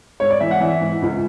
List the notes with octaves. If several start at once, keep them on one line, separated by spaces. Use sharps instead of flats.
G#2 C#5
D5
E3 E5
F#5
E3 E5
G#2
C#2